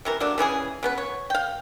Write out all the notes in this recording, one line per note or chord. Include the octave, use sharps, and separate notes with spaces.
C3 E3 A#4
F#3 A3 A#3 D4
C#3 E3 E4 G#4
C#3 B3 B4
C#5
F5 G5